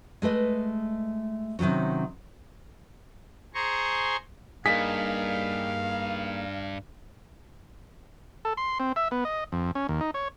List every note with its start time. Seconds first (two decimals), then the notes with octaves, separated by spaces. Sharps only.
0.22 G#3 A3 B4 D#5
1.59 C3 D#3 F3 F#3 C#4
3.54 G#4 C5 G#5 A#5 C6 C#6
4.66 G2 A#3 D#4 G#4 F5 B6
8.45 A4
8.57 C6
8.80 C4
8.96 E5
9.11 B3
9.25 D#5
9.52 F2
9.75 C#4
9.89 D#2
10.01 D#4
10.14 C#5